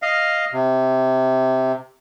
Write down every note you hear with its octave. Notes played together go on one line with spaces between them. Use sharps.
D#5 F5
C3